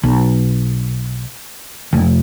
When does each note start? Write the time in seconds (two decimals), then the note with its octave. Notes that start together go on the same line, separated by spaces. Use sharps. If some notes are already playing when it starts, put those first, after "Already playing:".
0.03 B1
1.93 F1